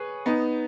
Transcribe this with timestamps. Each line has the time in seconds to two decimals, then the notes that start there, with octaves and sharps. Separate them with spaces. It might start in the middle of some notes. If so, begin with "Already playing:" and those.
Already playing: G#4 B4 C#5
0.26 B3 D#4